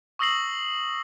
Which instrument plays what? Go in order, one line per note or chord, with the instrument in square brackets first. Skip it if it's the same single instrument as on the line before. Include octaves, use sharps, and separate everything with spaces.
[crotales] C#6 D#6 E6 A#6 C7 F#7